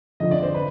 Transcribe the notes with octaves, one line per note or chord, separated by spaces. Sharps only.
F1 F2 D3 F3 D#5
D5
C5
B4